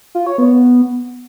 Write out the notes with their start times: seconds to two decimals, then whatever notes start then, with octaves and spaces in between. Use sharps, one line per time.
0.15 F4
0.27 C#5
0.38 B3